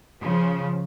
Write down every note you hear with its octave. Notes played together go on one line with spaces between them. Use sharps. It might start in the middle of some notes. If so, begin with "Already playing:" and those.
C#3 F3